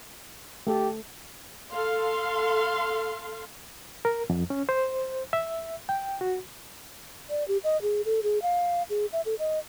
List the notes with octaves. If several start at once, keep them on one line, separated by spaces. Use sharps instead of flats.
A3 G4 A4
A4 F5 C6
A#4
F2
C#4
C5
E5
G5
F#4
D5
G4
D#5
G#4
A4
G#4
F5
G#4
E5
A4
D#5